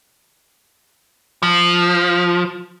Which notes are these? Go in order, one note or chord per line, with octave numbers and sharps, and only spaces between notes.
F3